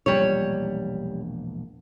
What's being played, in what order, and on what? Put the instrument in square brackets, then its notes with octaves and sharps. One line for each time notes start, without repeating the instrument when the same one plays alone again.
[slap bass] E1 A#1 [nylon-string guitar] G3 C#5